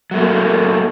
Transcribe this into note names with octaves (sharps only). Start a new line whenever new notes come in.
F#3 A3 A#3